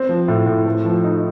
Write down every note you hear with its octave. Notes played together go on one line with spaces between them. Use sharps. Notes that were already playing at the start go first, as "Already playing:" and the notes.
Already playing: C4
F3
A2
A2
A3
F3
D#4